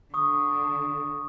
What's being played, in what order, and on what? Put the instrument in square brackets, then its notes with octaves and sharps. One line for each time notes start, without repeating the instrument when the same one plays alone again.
[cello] D3 [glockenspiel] C#6 D#6